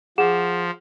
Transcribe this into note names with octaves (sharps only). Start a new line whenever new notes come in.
F3 G#4 F#5 E7